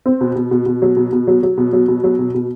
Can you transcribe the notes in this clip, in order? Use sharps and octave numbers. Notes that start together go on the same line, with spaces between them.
C4
B2
B2
B2
B2
F#3
B2
B2
F#3
F#3
B2
F#3
B2
F#3
B2
B2